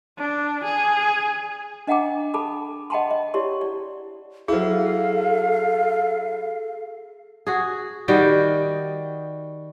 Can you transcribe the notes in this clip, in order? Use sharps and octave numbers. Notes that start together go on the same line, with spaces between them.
D4
G#4
D4 D#5 F#5 G5 A#5 D6
A4 A5 B5 D6
D#5 F#5 G5 A5 B5 C6
D#5
E4 G4 C#5 D5 C6
D5
F#3 E4 G#4 A4 F5
F#4 G#4
D#3 G3 F#4 G5